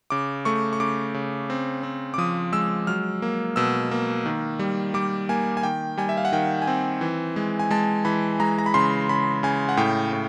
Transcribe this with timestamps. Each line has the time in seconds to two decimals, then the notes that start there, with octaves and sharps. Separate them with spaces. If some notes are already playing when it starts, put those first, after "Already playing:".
0.10 C#3 D6
0.45 A3 C#6
0.73 C#6
0.80 C#3 D6
1.14 C#3
1.50 C4
1.83 C4
2.14 D6
2.18 F3 D#6
2.52 G#3 E6
2.87 F#3 F6
3.22 A#3
3.56 B2 E6
3.91 A#3
4.26 D#3
4.59 G3
4.94 G3 D6
5.29 A#3 G#5
5.57 G#5
5.63 D#3 G5
5.98 G3 G#5
6.09 E5
6.17 F5
6.25 F#5
6.32 D#3 G5
6.62 G#5
6.67 C4 G5
7.01 E3
7.36 G#3
7.59 G#5
7.71 G#3 A5
8.05 E3 B5
8.40 G#3 A#5
8.58 A#5
8.66 B5
8.74 C#3 C6
9.09 C#3 B5
9.43 C#3 G#5
9.69 F#5
9.77 A2 G5
10.13 A2